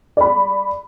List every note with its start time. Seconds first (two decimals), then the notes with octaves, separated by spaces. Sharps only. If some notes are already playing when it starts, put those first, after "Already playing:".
0.17 D5 B5